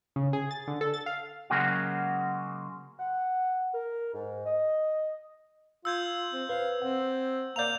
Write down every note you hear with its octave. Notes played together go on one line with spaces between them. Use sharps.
C#3
G#4
A6
D3
A4
A6
F5
C#3 F#3 G#3 A#3 C#4 F#4
F#5
A#4
G#2
D#5
F4 E6 G6 G#6
C4
B4 C5 F5
C4 F#5
A#3 D5 F5 A#5 G6 F7